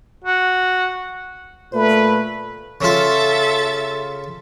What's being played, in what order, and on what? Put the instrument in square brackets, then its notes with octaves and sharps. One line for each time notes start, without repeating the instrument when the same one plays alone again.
[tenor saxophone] F#4
[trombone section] A#2 A3 [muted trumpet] B4
[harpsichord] C#3 F4 [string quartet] A4 E5 A6